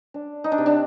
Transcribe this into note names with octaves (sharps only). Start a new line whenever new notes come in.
D4
D#4
D4
C3
D4